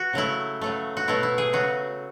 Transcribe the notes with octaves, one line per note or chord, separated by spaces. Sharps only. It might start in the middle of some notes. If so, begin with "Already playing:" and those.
Already playing: F#4
C#3 F#3 A3 E4
C#3 F#3 A3
F#4
B2 F#3 A3 E4
E4
G#4
C#3 F#3 A3 F#4